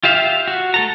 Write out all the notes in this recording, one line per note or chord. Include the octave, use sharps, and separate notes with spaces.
F4 G4 E5 F5
F#4
A3 A4 A#5